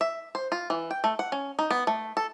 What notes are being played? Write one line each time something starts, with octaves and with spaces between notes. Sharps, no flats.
E5
C5
F4
E3
G5
A3
F#5
C#4
D#4
B3
A3
A4